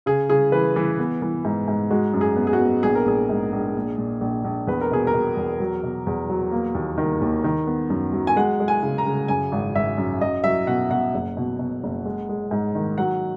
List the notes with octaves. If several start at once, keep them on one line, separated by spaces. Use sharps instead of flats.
C#3 G#4
C#3 G#4
E3 B4
E3
B3
E3
G#2
G#2
G#3 F#4
F#2
G#4
B3
G#4
F#4
B3
A#1 G#4
A#4
A#1 G#4
G#2
A#1
A#2
A#2
A#1
A#1
E2 B4
A#4
B2 G#4
A#4
B2
E2
F#3
B2
E2
F#3
A#3
D#2
D#3
D#2
D#3
B3
F#2
F#3
G#5
G#3 F#5
G#3
G#5
C#3
A#5
C#3
F#2 G#5
G#1
G#1 E5
F#2
F#3 D#5
F#3 E5
B2 F#5
B2 F#5
F#1
B2
B2
F#1
G#3
G#3
G#2
D#3
F#3 F#5